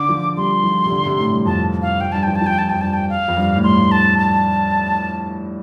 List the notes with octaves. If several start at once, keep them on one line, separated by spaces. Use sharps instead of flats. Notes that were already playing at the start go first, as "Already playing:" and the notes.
Already playing: D3 D6
F3
G3 C6
F3
C3
D3
C3
A2
G2
F2 A5
F5
F2 G5
G2 A5
F3 G5
A5
F3
G5
A5
F2 G5
G2 A5
G5
F5
F2
G2
A2
G2 C6
A5
A5